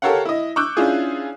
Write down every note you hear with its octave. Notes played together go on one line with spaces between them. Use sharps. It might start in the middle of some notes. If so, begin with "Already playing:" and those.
G4 A4 A#4 C#5 F5 F#5
E4 D#5
C#6 D6 E6 F#6 G6
C#4 D4 E4 F4 G#4